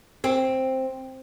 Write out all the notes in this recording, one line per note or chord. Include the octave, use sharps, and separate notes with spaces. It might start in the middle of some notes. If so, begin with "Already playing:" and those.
C4